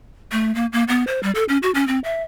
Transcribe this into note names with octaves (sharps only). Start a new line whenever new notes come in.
A3
A#3
A#3
B3
C5
G3
A4
C#4
F#4
C#4
C4
E5